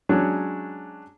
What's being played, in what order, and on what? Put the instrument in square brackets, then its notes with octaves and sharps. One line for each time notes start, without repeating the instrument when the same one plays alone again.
[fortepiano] F#3 G#3 C#4 D4 F#4